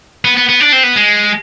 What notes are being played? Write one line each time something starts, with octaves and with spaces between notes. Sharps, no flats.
B3
B3
B3
D4
C4
B3
G#3